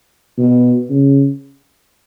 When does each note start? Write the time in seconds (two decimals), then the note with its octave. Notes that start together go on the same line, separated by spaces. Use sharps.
0.38 B2
0.90 C#3